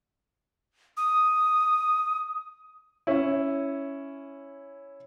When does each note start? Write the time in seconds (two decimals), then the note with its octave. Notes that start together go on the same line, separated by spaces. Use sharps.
0.97 D#6
3.07 C#4 E4